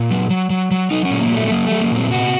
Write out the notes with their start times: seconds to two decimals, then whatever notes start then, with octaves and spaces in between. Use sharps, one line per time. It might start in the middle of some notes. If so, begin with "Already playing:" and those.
Already playing: A#2
0.11 F#3
0.30 F#3
0.50 F#3
0.71 F#3
0.91 F#3 D#4
1.05 C#4
1.11 A#2
1.20 A#3
1.31 F#3 A3
1.46 C4
1.51 F#3 A#3
1.66 A3
1.71 F#3
1.81 A#3
1.91 A#2 C4
2.10 C3 F#4